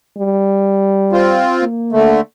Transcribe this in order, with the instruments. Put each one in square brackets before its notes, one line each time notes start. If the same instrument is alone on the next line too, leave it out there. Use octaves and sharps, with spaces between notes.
[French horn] G3
[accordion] C4 F4
[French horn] A#3
[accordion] D3 A3